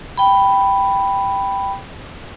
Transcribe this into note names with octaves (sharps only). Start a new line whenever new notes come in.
G5 B5